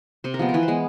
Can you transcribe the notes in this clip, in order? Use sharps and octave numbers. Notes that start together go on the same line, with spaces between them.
C3 C5
A#4
F3 G#3 B3
A#4
E3 B4
C5
G#3 B3